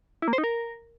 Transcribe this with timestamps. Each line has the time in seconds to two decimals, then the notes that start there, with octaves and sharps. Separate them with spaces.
0.22 E4
0.28 A#3
0.33 C5
0.38 D#4
0.44 A#4